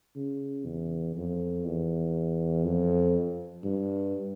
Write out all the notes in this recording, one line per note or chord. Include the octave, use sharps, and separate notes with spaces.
C#3
E2
F2
E2
F2
G2